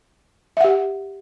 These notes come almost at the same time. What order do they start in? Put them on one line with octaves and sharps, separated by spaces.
E5 F#5 G4